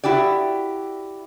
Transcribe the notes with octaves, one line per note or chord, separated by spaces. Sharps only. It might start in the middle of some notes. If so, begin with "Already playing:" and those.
E4 F#4 G4 D5